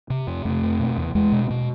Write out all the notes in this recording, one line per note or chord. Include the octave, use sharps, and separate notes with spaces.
C3
F2
F2 A3
C3
B2
E2
E2 G#3
B2
B2